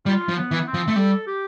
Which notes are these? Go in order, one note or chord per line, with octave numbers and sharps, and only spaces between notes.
G3 F4
F3
B3
E3
C4
F3
A3
G3 A4
G4